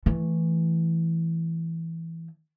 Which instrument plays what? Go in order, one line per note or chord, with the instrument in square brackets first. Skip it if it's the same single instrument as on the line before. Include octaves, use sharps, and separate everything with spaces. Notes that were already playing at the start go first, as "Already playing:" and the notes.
[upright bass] E3 A3